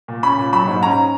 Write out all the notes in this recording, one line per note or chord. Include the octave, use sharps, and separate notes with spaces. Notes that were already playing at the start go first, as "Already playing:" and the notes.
A#2
C#4 B5
A#2
F#3 B5
G#2
C#4 A#5